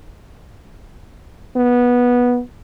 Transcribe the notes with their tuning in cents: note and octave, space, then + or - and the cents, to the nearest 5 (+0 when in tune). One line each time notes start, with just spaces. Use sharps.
B3 -15